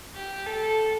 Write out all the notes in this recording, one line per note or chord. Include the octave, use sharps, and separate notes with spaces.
G4
A4